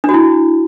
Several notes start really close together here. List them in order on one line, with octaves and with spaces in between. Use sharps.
D4 F#4 E4